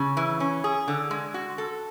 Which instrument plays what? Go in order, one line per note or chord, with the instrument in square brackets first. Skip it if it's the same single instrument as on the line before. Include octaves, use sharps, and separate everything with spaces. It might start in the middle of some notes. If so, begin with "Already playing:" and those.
Already playing: [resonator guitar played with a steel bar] C#3
E3
C#4
G#4
D3
G#3
F#4
A4